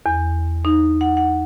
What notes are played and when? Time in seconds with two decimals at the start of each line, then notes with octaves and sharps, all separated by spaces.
0.06 E2
0.65 D#4
1.01 F#5
1.17 F#5